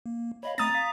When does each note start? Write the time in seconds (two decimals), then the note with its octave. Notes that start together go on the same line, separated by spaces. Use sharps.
0.06 A#3
0.43 C#5 D#5 F5 B5
0.58 A3 C4 A#5 D#6 A6
0.75 F5 B6